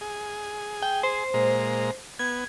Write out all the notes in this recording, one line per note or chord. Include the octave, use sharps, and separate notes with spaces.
G#4
G5
C5
A#2 G#3 A#5
B3 G#6